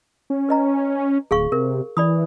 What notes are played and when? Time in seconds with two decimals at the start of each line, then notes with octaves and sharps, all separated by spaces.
0.30 C#4
0.49 B4 D#5 A#5
1.31 D1 G#4 F5 C#6
1.52 C3 A#4
1.97 E3 D5 B5 D#6